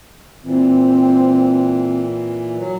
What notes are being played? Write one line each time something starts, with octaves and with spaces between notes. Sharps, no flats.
A#2 E3 C4
F#3